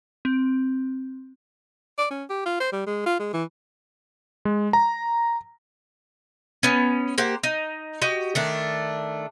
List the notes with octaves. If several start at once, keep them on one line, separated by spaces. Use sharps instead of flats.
C4
D5
C#4
G4
F4
C5
G3
G#3
F4
G#3
E3
G#3
A#5
B3 C#4
A#3 G4 C5 F#5
D#4
F#4 G4 D#5
D#3 A3 D4